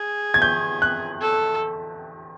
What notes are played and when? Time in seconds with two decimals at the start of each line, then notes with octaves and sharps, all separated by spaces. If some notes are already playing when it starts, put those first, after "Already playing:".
Already playing: G#4
0.34 G#6
0.42 G6
0.82 F#6
1.21 A4